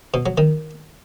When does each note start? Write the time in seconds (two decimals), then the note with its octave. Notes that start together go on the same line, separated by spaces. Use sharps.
0.14 B2
0.26 F#3
0.38 D#3